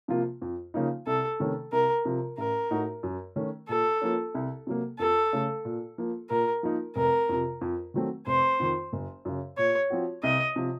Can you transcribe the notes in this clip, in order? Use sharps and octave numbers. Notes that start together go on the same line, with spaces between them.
C3 F3 A#3 F4
F2
C#3 F3 A#3 D#4
C2 A4
C3 D#3 A3 C#4
C2 A#4
C3 F3
A1 A#4
A2 A3 D#4 F#4
F#2
D#3 A3 C#4
A#2 A4
F3 A#3 C#4
C2
C3 F#3 A#3
F2 A4
C#3 A3
A#2
F3 A#3
A#2 A#4
F3 A#3 D#4
F1 A#4
F2 C3
F2
D#3 F#3 A3 C4
F1 C5
F2 D#3
F#1
F#2 C#3
A#2 C#5
F3 C4 F#4
C2 D#5
C3 F3